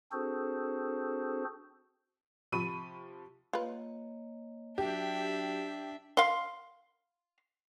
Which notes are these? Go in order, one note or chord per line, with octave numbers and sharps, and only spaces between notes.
C4 D4 F#4 G#4 A4 C5
C3 F3 B5 C#6 D#7
A#3 F4 B4 C#5 D#5
F#3 D4 F#4 G4 E5
F5 C6